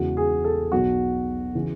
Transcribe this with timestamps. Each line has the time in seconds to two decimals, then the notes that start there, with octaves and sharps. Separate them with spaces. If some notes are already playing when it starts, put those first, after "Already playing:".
Already playing: E2 C#3 E3 G#3 F#4
0.17 G#4
0.44 A4
0.72 B1 B2 F#3 F#4
1.55 C#3 E3